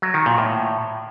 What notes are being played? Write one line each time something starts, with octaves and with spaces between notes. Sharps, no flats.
F#3
D#3
A#2
A2